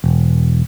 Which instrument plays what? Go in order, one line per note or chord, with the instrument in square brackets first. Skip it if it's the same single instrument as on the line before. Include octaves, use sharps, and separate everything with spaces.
[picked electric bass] E1